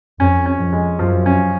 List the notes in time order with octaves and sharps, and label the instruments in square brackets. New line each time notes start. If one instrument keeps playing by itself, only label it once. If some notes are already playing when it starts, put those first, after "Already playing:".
[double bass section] F2 [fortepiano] C#4
[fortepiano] C#4
[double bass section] F2
[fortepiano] G#3
[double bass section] F#2 [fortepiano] F3
[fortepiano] C#4